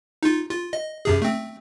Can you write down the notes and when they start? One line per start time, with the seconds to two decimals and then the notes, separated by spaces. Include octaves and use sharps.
0.23 D#4 F4
0.50 F4
0.73 D#5
1.05 F#2 C3 G#4
1.22 A3 C4